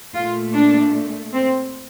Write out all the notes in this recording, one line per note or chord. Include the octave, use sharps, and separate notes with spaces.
A#2 A3 F4
D4
C4